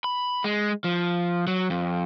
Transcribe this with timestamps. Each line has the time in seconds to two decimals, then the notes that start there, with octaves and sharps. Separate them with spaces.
0.04 B5
0.44 G#3
0.84 F3
1.47 F#3
1.70 F2